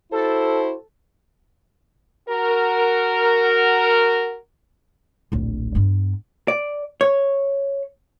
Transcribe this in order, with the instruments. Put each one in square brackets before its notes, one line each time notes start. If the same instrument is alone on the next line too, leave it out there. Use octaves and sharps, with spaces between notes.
[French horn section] E4 F#4 C5 [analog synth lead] A4
[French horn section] F#4 A#4
[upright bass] D1 A#1
G2 B3
[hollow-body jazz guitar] D5
C#5